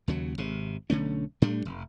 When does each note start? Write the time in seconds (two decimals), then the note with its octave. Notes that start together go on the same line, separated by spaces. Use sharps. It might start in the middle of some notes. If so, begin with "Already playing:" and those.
0.08 D#2 C#3 F#3
0.38 G#1 C3
0.90 B1 D3 A3 C#4
1.42 A2 G3 A3 D4
1.65 F1